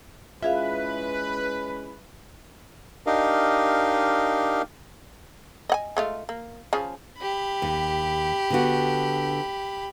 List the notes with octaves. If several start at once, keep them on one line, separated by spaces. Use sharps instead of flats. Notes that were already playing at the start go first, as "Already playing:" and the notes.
G#3 C#4 E4 F4 G#4 B4 E5 F5
D4 D#4 G4 A#4 D#5 F5
D#5 F#5 G#5
G#3 A3 F4
A#3
C#3 F3 G#4
G4 B5
D#2
D3 B3 F#4